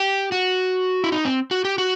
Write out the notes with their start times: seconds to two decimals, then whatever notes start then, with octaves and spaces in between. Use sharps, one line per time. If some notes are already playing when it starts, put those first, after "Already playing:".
Already playing: G4
0.32 F#4
1.04 E4
1.12 D#4
1.25 C4
1.51 F#4
1.65 G4
1.78 F#4